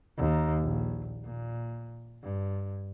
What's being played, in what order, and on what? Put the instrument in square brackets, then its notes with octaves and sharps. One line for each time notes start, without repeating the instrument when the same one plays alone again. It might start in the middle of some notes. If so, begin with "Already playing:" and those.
[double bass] D#2
A#1
A#2
G2